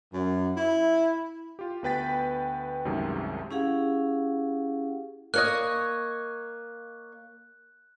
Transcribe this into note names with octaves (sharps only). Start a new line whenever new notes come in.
F#2
E4
F4 G4
D2 B3 B4 G5 A6 B6
C2 F#2 C3 D#3 G#3 A3
C#4 E4 G4 G#4 F5 F#5
A#3 C#5 D#5 F#6